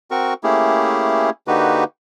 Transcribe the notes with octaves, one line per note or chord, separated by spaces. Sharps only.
C4 F#4 A#4 C#6
A3 A#3 C#4 E4 G4 G#4
D3 A#3 D#4 F#4 G4 B4